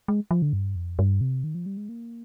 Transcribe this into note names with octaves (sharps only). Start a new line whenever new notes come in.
G#3
F3
D3
G2
F2
G2
C3
D#3
F3
G3
G#3
A#3